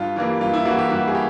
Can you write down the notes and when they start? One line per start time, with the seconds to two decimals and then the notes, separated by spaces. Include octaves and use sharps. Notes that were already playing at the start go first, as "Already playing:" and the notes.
Already playing: G2 F4
0.16 E3 G3 A#3
0.40 G2 F4
0.54 E4
0.65 E3 G3 A#3 F#4
0.79 G4
0.90 G2 F#4
1.08 G#4
1.15 G4